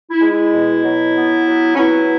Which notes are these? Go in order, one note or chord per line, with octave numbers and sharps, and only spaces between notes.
E4
G#3
E4
B2
F#3
B3
F#3
C#4
B3 E4